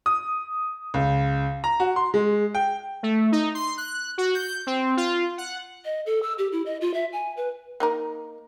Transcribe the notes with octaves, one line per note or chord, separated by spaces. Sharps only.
D#6
C#2
A#5
F#4
C6
G#3
G5
A3
D#4
C6
F#6
F#4
G6
C4
F4
F#5
D#5
A4
E6
G4
E4
D#5
F4
E5
G#5
B4
A#3 D#4 A#4